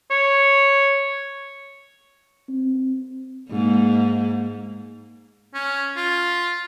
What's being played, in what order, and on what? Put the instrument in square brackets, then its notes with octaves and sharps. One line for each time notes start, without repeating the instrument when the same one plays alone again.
[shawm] C#5
[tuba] C4
[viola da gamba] G#2 A#3
[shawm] C#4
F4